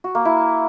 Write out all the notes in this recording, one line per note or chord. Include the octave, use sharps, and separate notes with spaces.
F#4
A#3
E4